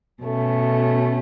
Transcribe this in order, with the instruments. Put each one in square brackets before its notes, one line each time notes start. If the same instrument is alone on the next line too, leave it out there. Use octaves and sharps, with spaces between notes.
[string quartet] B2 A3 C#4